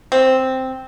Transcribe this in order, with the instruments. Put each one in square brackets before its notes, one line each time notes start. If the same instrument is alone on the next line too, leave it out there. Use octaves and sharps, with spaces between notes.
[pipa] C4